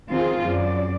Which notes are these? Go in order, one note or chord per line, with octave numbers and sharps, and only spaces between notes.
D#3 C4 F4 G#4
F#2 D5